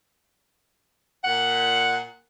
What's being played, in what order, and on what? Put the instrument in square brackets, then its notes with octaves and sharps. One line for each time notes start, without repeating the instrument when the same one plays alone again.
[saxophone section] A#2 F#5